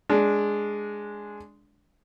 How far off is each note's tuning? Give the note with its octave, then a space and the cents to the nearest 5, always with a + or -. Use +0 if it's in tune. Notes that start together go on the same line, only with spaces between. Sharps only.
G#3 +0 D4 -10